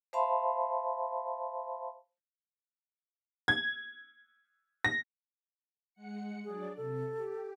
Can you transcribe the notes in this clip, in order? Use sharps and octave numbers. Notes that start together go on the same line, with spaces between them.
C5 E5 F5 A5 B5 C6
G#6
A#6
G#3 F#5 C#7
F#3 D4 G#4 D5
C3 A4
G4